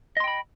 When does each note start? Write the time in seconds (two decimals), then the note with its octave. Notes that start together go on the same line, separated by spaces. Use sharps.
0.17 D#5
0.20 C6
0.24 G5
0.28 B5